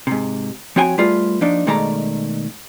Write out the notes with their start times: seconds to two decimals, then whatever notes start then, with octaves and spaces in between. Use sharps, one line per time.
0.07 G#2 C3
0.76 F3 C4 F#4 C#5 G5 G#5
0.98 G3 A3 F4 G#4 B4
1.41 F3 A#3 D4 D#4
1.67 B2 D#3 G#3 A3 D5 A#5